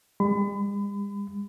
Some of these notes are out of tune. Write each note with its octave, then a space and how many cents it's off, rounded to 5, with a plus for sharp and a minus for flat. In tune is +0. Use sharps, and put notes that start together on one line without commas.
G3 +45 B5 +35